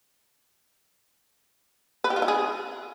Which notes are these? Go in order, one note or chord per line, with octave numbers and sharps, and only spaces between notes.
B4
G4
F4
E4
G#4